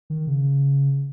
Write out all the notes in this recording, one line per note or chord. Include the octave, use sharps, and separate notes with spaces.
D#3
C#3